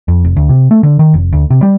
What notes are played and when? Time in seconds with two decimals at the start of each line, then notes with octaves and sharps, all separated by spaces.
0.08 F2
0.24 F1
0.36 D2
0.49 C3
0.71 A3
0.83 D3
0.99 D#3
1.14 F1
1.32 D2
1.50 C3
1.63 G3